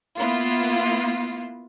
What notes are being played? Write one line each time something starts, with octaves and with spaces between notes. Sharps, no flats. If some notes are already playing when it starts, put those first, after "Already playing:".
A#3 B3 E4 F4